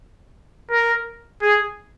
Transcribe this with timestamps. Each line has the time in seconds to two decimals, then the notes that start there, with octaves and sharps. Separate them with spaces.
0.71 A#4
1.42 G#4